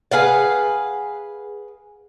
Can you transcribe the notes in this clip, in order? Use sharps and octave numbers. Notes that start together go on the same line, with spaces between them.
G#4 B4 F5 F#5